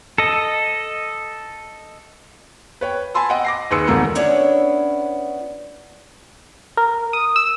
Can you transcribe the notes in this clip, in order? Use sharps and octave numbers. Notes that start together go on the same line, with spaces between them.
A4 D#5
B4 C#5 G5
G#5 A5 B5 C6 E6
D#5 F#5 G5
D6 A#6 C7
D#2 G#4 B4 C6 E6 C#7
E1 D#2 A3 A#3 A#5 E6
B3 C#4 D4 E4 C#5
A#4
D#6
E6